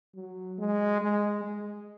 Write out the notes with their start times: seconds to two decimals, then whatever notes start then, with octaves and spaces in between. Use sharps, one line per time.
0.15 F#3
0.58 G#3
1.01 G#3
1.44 G#3